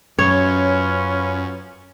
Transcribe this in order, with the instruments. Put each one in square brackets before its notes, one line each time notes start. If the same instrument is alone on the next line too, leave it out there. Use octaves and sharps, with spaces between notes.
[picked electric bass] F#2 [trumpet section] C#4 F4 B4 [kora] C#5